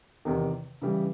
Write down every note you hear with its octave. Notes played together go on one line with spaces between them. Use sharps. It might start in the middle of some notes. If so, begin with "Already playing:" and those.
E2 C3 D#3
C#3 E3 G3